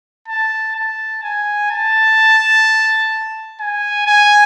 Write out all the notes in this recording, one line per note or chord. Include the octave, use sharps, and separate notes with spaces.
A5
A5
G#5
A5
G#5
G#5